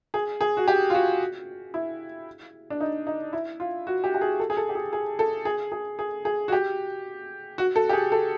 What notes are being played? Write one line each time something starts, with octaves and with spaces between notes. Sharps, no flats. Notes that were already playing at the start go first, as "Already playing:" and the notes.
G#4
G#4
F#4
G4
F4
F#4
E4
D4
D#4
D#4
E4
F4
F#4
G4
G4
G#4
A4
G#4
A4
G4
G#4
G#4
A4
G#4
G#4
G#4
G#4
F#4
G4
F#4
A4
G4
G#4
A4